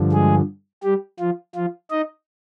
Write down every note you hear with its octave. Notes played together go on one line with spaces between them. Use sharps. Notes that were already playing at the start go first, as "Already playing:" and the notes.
Already playing: G2 D3 F3
G#3 G#4
G3 G4
F3 F4
F3 F4
D#4 D#5